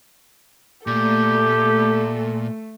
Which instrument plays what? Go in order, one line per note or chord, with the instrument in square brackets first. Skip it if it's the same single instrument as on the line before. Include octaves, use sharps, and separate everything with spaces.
[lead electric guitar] A#2 [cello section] A3 [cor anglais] G4 [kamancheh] A4